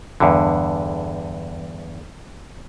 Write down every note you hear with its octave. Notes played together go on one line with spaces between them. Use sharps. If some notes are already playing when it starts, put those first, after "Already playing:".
E2 G2 D3